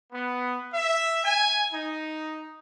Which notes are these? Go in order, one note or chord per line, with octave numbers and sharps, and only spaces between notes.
B3
E5
G#5
D#4